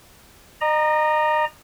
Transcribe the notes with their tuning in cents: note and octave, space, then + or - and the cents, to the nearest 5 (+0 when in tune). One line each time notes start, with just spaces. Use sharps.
D#5 -35 A#5 +0